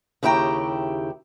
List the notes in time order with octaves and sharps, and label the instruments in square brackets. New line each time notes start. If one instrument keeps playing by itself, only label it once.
[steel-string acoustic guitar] D#2 C#3 E4 G4 G5 A#5